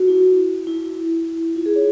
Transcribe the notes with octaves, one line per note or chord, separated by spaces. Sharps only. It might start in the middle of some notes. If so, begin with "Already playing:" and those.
Already playing: F#4
E4
E4
F4
G#4
C#5